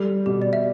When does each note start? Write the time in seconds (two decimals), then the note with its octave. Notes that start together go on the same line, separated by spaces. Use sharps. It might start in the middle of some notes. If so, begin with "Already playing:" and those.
Already playing: G3 A4
0.26 B2 G4
0.42 D5
0.53 E5